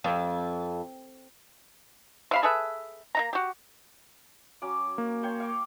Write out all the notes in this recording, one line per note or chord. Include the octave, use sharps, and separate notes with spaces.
F2
C3 F5 B5
G#4 A4 B4 E5
A#3 D#4 A#5
F#4 G4
F#3 C#4 D6
A#3
C#5 G5 C6
F5 D6